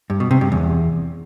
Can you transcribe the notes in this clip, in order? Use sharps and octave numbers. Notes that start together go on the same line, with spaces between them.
G2
B2
C3
G2
E2